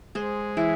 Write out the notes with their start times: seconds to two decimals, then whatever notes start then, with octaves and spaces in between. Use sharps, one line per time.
0.15 G#3 G#4 C5
0.57 E3 E4 G#4